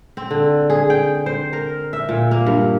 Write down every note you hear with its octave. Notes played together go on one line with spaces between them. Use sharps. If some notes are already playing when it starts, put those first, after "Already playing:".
C4
D3
G#4
G5
C5
A#4
E5
A#2
A#3
G2